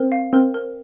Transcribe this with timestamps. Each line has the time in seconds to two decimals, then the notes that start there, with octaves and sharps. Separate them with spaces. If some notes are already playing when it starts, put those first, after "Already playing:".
Already playing: C4 A#4
0.12 F5
0.33 C4 A#4
0.54 A#4